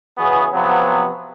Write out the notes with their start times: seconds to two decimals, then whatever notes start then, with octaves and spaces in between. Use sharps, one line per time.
0.18 C#3 E3 B3 F#4 G#4
0.53 C3 F3 F#3 B3